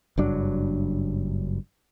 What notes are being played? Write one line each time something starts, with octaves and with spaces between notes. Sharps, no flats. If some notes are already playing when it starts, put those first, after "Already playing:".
F#1 G2 F#3 D4